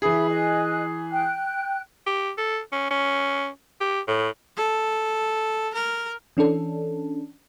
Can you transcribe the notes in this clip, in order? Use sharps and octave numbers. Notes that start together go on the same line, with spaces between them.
E3 G#4 E5 B5
D#5 G#5 F#6
G5 F#6
G4
A4
C#4
C#4
G4
A2
A4
A#4
E3 C#4 D4 A4